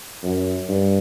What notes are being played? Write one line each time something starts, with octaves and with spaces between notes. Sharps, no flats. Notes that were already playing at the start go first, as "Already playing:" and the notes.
F#2
G2